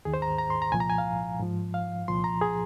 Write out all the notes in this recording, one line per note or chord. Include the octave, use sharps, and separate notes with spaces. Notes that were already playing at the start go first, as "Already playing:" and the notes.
D#2 D#3 G#4
C5
A#5
A#5
C6
A#5
C2 A#2 F3 G#5
A#5
G#5
F5
G#2 F3
F5
C2 A#2 F3 C6
A#5
G#4